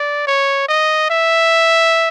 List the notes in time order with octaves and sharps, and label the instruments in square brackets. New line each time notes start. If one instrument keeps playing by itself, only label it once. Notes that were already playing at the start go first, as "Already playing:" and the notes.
Already playing: [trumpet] D5
C#5
D#5
E5